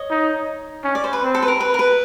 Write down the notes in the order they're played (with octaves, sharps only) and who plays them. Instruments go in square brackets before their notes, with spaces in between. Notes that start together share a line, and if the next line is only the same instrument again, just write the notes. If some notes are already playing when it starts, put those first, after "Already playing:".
Already playing: [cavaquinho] C#5 D#5
[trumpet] D#4
C#4
[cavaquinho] D5
C5
B4
[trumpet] C4
[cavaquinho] A4
B4
A#4
B4
A#4
B4